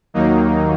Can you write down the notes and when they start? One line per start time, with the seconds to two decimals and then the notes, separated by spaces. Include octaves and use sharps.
0.14 D#2 D#3 F#3 A#3 D#4